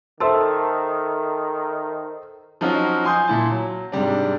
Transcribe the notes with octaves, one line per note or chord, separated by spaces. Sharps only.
D#3 A4 C5 E5 A5 C6 E6
F3 F#3 C#4 D#4 F4 F#4
G#5 C6 D#6 G6
A#2 E4 A5
F#3
G#2 C3 G3 D4